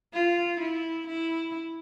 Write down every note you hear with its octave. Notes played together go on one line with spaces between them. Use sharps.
F4
E4
E4